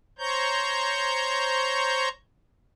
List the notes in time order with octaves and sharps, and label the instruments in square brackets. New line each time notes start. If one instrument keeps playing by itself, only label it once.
[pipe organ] C5 C#5 A#5 C#6 G6